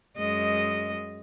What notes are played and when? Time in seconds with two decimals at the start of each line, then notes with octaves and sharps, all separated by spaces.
0.18 F#2 G#3 D#5